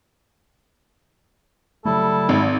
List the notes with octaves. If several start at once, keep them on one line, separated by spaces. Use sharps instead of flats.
C#3 F#3 G3 A3 E4 A4
G#1